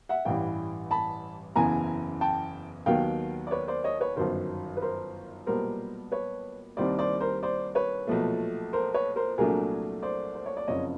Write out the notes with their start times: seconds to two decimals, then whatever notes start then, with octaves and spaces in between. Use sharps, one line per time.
0.09 E5 F#5
0.25 A1 G2 E3 G3 F5 G5
0.91 A5 B5
1.56 F#1 E2 C#3 E3 G#5 A#5
2.21 G5 A5
2.86 D#2 D#3 F#3 B3 F5 G5
3.47 D5
3.51 B4 C#5
3.68 C5 D5
3.84 C#5 D#5
4.00 B4 C#5
4.16 G1 F#2 D#3 A#4 C5
4.77 B4
4.82 A#4 C5
5.46 B1 A#2 G3 B3 A#4 C5
6.12 B4 C#5
6.77 C2 C3 D#3 G3 A#3 C5 D5
6.99 C5 D5
7.20 A#4 C5
7.43 C5 D5
7.75 B4 C#5
8.07 B1 A#2 F3 A3
8.73 A#4 C5
8.94 B4 C#5
9.16 A#4 C5
9.38 C2 A#2 F#3 A3 D4 G#4 A#4
10.03 C5 D5
10.35 C5
10.46 C#5
10.57 D5
10.68 F#1 F2 C#3 C#5 D#5